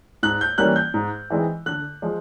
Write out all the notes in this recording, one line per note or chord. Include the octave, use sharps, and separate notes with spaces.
G#2 F#6
G6
E3 G3 A#3 C#4 F#6
G6
G#2
E3 G#3 C4 D#4
D3 F#6
F3 G#3